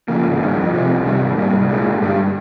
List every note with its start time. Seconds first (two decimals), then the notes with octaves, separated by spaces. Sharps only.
0.08 C#3 F3 A#3
0.25 G#1
0.40 G2 D#3
0.57 F2
0.73 C3 F3 C4
0.89 C2
1.05 C3 D#3 G3
1.20 G#1
1.37 G#2 G3 A#3
1.53 C2
1.68 A#2 G#3
1.85 G1
2.01 G2 G3